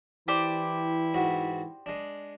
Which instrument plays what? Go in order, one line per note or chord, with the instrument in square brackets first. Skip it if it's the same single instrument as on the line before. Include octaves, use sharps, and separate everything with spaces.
[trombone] E3 [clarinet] E4 [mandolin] G4 C5 D5
[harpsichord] G#2 F#4
G#3 D4